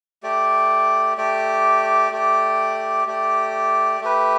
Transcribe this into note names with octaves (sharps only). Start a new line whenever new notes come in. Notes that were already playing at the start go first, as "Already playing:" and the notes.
A3 G4 D5
A3 G4 D5
A3 G4 D5
A3 G4 D5
A3 G4 B4